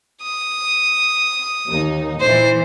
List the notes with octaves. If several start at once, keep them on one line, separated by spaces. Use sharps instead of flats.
D#6
D#2 D#4
A#2 E3 C5